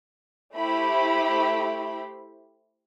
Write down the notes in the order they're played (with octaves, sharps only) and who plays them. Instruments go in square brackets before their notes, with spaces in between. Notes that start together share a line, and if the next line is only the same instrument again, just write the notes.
[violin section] A3 E4 G4 C5 B5